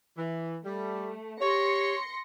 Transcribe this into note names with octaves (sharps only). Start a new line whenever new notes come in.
E3
G3 A3
G4 C#5 C6 A#6 C#7